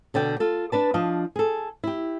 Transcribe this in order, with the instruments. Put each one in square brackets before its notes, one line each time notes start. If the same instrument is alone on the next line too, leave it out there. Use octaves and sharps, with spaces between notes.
[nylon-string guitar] B2 D3 D5 G5
F4 A4
D4 B4 A5
F3 D4 D#5 F5
G#4 A4
E4 G4